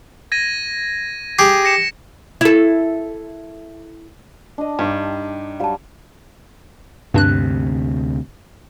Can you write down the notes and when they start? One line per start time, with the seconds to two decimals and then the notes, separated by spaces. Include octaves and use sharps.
0.32 G#6 A#6 D#7
1.39 G4 G#4
1.65 A#6 C#7 E7
2.41 E4 A4
4.58 D4 D#5
4.79 G2 D#4 G4 G5
5.60 F#3 G3 F5 A5
7.14 D2 G2 C3 D4 F#6